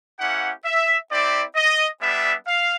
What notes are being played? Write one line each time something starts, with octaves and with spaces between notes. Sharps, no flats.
A#3 C#4 E4 G4 F#5
E5
C4 E4 G4 D5
D#5
G3 B3 D4 E5
F5